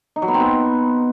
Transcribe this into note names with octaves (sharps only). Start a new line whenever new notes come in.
D#4
F#3
B3
C4
B3